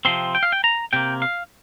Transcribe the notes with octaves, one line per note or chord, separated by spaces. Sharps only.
C3 F3 C4 C6
G5
F5
G5
A#5
C3 A#3 G5
F5